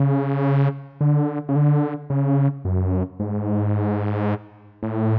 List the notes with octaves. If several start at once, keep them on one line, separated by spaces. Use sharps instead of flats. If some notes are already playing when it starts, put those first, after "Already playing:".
Already playing: C#3
D3
C#3
D3
C#3
F#2
G#2
A2